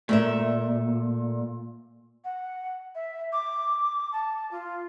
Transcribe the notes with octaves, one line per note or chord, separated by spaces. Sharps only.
A#2 A3 A#4 E5
F#5
E5
D6
A5
F4